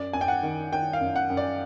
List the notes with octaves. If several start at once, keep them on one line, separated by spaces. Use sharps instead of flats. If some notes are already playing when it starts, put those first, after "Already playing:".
Already playing: F#2 D5
F#2 G#5
G5
F#5
D#3
D#3 G5
F5
F#2
F#5
F#2
D5